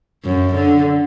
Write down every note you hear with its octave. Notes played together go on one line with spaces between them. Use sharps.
F#2
D3